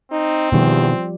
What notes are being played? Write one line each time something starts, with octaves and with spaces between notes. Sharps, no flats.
C4 D#4
E2 B2 D#3 F3 G3 G4